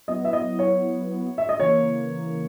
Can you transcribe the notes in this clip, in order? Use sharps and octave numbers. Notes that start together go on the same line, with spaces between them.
F#3 B3 E4 D#5
E5
D#5
C#5
E5
D#5
C#3 E3 A#3 C#5